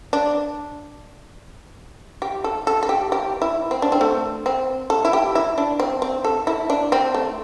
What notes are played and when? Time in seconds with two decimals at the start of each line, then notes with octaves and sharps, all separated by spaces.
0.13 D4
2.22 G4
2.44 A4
2.67 A4
2.83 A4
2.89 G4
3.12 G4
3.42 E4
3.71 C4
3.82 D4
3.92 C4
4.01 A3
4.46 C4
4.90 A4
5.05 E4
5.13 G4
5.35 E4
5.58 D4
5.80 C4
6.02 C4
6.25 A4
6.47 E4
6.70 D4
6.92 C4
7.15 A3